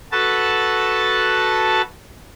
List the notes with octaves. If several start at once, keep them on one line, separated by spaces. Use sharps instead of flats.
F#4 A4 B4 A5